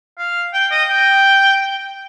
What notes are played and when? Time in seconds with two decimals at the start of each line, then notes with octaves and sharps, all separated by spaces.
0.18 F5
0.54 G5
0.71 D#5
0.89 G5